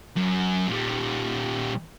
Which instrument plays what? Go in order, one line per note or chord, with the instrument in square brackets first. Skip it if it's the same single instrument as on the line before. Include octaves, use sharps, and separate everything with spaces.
[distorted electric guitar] F#2
A#2 G3